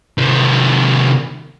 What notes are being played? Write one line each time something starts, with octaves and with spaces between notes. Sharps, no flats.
C3 D#3